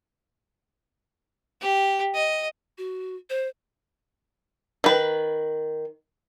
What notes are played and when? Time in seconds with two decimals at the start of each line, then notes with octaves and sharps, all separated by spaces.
1.61 G4
2.15 D#5
2.78 F#4
3.30 C5
4.84 D#3 B4